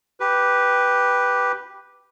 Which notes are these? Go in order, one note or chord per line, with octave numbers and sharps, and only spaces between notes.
G4 B4